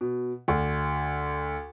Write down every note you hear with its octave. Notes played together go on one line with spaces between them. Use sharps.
B2
D2